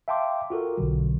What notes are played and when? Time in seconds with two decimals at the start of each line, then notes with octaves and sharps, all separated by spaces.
0.08 E5 F5 G5 A5 C6 D6
0.50 F4 F#4 A4 A#4
0.78 B1 B2 D3 F#3